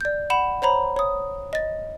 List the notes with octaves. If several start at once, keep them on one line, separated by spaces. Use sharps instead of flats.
D5 G6
F#5 B5 E7
C5 C#5 A#5 B5
C#5 D#6
D#5 A6